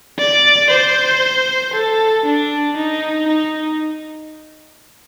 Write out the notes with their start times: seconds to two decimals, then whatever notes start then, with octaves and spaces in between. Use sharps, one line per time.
0.18 D5
0.70 C5
1.73 A4
2.25 D4
2.76 D#4
3.28 D#4